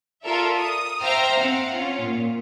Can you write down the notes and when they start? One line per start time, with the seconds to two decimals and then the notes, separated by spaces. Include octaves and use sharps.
0.24 F4 A4 A#4 D5 E5
0.56 D#6
1.03 C5 E5 F5 G5 A#5 F6
1.38 C4 F5 F#5
1.73 C#4 F4
2.03 A#2